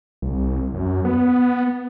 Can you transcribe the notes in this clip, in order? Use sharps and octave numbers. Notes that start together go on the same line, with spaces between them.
C2
F#2
B3